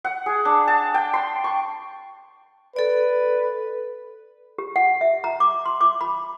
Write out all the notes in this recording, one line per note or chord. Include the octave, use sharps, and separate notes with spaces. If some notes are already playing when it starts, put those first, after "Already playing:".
F#5
G#4
D4
A5
G5
C6
C#6
A4 B4 D5
G4
F#5
E5
A#5
D6
C6
D6
B5